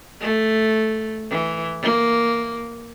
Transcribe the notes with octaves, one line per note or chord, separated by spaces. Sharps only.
A3
E3
A#3